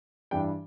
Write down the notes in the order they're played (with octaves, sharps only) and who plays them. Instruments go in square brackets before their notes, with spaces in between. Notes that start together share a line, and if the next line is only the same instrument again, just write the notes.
[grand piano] G2 E3 G3 D4 G5